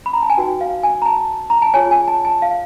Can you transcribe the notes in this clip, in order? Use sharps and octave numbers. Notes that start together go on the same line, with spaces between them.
B5
A#5
A5
G#5
D#4 F#4 B4 G5
F5
G#5
A#5
A5
A#5
A5
F4 G#4 C#5 G#5
G#5
A5
A5
F5